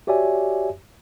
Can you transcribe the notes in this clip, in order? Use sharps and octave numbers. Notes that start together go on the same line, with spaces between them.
F#4 G4 C#5 D5 E5 G#5